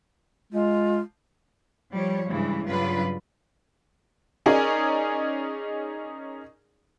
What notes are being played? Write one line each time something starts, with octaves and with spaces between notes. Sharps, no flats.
G#3 F4
F3 G3 C#5
G2 C#3 E3 G#3
G2 C#3 F#3 F4 B4 D5
C#4 D#4 G#4 A#4 D5 G#5